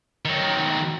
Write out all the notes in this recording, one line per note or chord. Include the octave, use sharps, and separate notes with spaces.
D#3 F#3